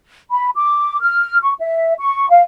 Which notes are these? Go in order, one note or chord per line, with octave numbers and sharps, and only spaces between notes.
B5
D6
F6
C#6
E5
C#6
F5